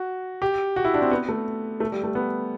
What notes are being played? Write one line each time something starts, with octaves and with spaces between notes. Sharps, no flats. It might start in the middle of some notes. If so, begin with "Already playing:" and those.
Already playing: F#4
G4
F#4
E4
D4
C4
B3
A3
A3
G3
A3
B3